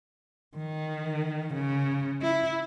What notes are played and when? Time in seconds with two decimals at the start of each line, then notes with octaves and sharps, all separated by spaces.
0.57 D#3
1.55 C#3
2.22 E4